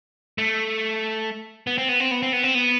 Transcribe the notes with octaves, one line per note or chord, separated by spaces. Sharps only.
A3
B3
C4
B3
C4
B3
C4
B3
C4
B3